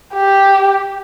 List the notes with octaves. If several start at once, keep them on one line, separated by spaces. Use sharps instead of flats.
G4